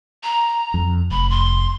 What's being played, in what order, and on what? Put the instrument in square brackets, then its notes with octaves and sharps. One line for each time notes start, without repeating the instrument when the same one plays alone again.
[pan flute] A#5
[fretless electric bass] F2
[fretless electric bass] F1 [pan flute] B5
[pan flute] C6